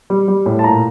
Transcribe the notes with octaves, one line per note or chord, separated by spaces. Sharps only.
G3
G3
A2
A5
A#2 A#5